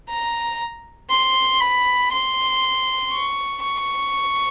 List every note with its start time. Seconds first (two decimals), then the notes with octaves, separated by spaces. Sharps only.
0.09 A#5
1.10 C6
1.60 B5
2.12 C6
3.13 C#6
3.63 C#6